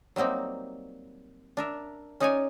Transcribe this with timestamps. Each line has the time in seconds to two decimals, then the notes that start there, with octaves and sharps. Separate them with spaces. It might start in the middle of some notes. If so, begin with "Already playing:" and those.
0.16 F#3 G3 A#3 C4 D#4
1.57 D4 A#4 E5
2.20 C#4 D#4 G#4 C#5 D5 G#5